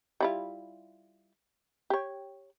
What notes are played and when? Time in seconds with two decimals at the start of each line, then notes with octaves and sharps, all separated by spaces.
0.20 G3 E4 F4
1.90 G4 C#5